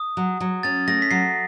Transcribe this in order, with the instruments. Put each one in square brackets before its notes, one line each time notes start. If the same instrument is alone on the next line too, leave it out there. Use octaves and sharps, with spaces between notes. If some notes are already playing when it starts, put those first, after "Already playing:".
Already playing: [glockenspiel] D#6
[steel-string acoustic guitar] F#3
F#3
[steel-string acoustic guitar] C#4 [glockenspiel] A6
[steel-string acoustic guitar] A3 [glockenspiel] A#6
[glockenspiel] B6
[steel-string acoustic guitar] F#3 [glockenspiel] C7